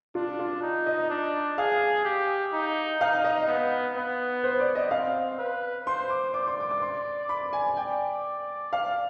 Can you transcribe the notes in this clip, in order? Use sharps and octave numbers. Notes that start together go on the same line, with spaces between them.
D4 F4
F4
D#4
D#5
D4
G#4 F5
G4
D#4
D#4 F5
D#5
B3
B3
C5
D5
D#5
C4 F5
B4
C5 C6
D6
D5 D6
C6
D6
D6
C6
B5
G#5
D5 G5
F5